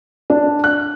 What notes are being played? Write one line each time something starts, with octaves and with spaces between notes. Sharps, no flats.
D4
F#6